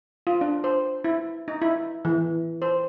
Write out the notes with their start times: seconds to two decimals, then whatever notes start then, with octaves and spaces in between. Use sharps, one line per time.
0.27 F4
0.41 D4
0.64 C5
1.04 E4
1.48 D#4
1.62 E4
2.05 E3
2.62 C5